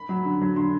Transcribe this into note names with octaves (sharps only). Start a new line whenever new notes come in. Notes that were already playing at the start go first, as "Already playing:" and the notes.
Already playing: B5
F#3
D3
F#3
D3 C6